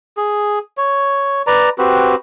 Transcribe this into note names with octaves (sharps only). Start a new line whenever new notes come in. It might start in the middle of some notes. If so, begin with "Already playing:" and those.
G#4
C#5
B4 D5 A#5
C4 F#4 G4 B4